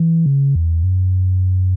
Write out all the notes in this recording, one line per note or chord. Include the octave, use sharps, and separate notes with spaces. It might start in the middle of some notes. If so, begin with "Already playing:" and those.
Already playing: E3
C#3
E2
F#2